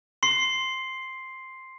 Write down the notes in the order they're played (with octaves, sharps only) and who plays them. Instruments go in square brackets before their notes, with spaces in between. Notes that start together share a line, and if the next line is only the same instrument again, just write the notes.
[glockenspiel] C6 C7